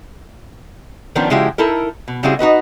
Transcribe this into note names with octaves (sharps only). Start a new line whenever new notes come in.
D#3 F3 B3 C#4 D4
C#3 F3 G#3 E4 F#4 G4
D#4 E4 A4 A#4
B2
C#3 G3 C4 E4 F#4 G#4
D#4 F#4 B4 D#5